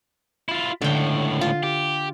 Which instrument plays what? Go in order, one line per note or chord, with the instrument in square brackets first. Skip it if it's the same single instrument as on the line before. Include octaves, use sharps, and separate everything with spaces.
[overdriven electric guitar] E4 F4
[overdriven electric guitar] C#2 A2 [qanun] D3 G5
[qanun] F4
[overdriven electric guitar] G4